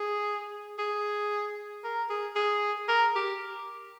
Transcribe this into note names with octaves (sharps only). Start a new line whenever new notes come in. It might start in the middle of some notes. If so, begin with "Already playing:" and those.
Already playing: G#4
G#4
A#4
G#4
G#4
A#4
G4